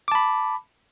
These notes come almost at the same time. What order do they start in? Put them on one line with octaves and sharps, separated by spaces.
D6 A5 B5